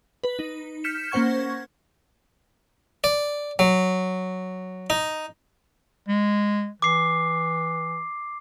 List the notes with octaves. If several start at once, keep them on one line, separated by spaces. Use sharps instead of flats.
B4
D#4
F6 G6 B6 C#7 E7
A#3 C#4 C5 F#5 C#6 G#6
D5
F#3
D#4
G#3
E3 D6 C7